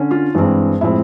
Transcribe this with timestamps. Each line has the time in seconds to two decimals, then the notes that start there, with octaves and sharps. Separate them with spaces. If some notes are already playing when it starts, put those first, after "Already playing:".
Already playing: D3 C#4
0.11 F4
0.34 G2 E3 G#3 C4
0.81 A2 F3 G#3 C4 E4